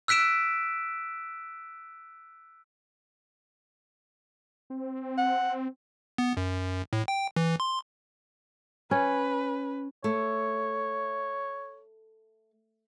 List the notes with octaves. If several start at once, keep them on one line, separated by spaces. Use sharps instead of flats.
E6 F#6 B6 D7 E7
C4
F#5
B3
F#2
A2
G5
E3
C6
C#4 B4
A3 C#5